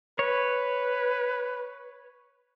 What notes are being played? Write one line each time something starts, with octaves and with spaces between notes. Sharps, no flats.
B4 C#5